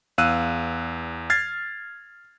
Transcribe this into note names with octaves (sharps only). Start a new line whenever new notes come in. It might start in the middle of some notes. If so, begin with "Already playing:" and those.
E2 F5 E6 F#6 D#7
F6 G#6 A6 C7